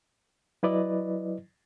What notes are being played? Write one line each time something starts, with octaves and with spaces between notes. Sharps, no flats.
F#3 E4 B4 D5 D#5